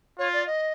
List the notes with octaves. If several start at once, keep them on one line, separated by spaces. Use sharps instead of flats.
F4 C#5
D5
D#5